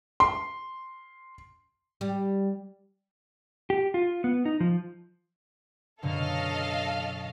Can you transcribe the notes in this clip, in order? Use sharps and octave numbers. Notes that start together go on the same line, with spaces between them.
C6
G3
G4
F4
B3
D#4
F3
F#2 B2 D3 A4 D#5 F5